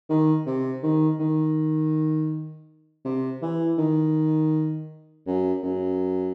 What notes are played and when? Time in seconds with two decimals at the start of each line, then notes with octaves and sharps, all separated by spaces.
0.09 D#3
0.46 C3
0.83 D#3
1.20 D#3
3.05 C3
3.42 E3
3.78 D#3
5.27 F#2
5.63 F#2